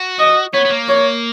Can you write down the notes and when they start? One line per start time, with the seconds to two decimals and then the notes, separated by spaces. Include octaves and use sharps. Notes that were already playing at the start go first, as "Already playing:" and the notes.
Already playing: F#4
0.19 D#5
0.53 B3 C#5
0.65 B3
0.70 A#3
0.88 C#5